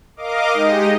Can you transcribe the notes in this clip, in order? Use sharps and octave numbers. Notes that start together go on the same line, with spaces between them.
A#4 D#5 F5 D6
G#3 D#4 G4 D#5